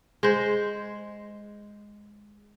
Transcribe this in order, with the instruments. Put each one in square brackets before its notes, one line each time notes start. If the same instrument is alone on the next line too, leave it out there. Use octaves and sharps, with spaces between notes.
[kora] G#3 C5